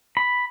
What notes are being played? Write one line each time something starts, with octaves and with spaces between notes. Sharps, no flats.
B5